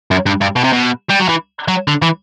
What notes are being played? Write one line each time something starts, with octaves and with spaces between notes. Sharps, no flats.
F#2
G2
G2
B2
C3
B2
G3
F#3
E3
F#3
D3
E3